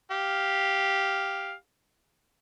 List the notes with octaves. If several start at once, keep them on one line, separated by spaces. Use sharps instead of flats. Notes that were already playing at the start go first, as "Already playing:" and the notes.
G4 F5